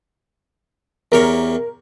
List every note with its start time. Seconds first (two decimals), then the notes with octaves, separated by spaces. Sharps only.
1.12 E2 G4 A#4 C#5